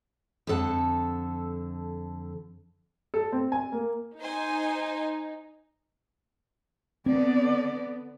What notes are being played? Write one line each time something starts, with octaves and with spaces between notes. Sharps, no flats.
F2 D3 A4 F#5 A5
A4
C4
G#5
A#3
D#4 C5 G#5
D3 B3 C4 D5